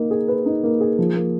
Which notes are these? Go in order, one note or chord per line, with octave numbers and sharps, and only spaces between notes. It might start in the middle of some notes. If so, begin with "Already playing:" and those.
Already playing: A#3 D#4
G#4
B4
D#4
A#3
G#4
F3
A#3